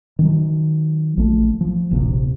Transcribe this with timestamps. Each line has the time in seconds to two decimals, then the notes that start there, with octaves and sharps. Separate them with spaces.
0.19 D#3 F#3
1.17 A#1 A3
1.61 F3
1.91 D#1 A#1 A2 C3